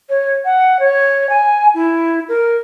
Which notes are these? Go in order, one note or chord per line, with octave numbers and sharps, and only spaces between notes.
C#5
F#5
C#5
G#5
E4
A#4